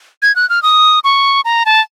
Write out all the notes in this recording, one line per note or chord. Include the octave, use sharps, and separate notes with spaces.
G#6
F#6
F6
D#6
C#6
A#5
A5